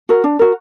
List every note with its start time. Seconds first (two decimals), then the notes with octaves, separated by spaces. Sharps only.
0.09 F#4 A#4
0.24 D4
0.39 F#4 A#4